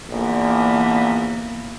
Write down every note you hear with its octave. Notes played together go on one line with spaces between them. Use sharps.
A#1 D3 E3 A#3 B3